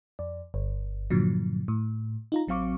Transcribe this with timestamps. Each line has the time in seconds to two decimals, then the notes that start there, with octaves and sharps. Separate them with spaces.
0.19 F2 D5
0.54 G1
1.10 G2 A#2 D3 F3 F#3
1.68 A2
2.32 D#4 F4 A#5
2.48 A1 F#3 C4 F5 C#6 D6